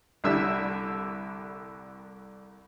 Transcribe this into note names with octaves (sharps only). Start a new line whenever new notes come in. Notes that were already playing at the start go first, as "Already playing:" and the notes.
C2 D3 G3 E4 E5 E6